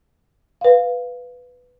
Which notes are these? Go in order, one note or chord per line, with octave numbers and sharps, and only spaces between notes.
B4 F5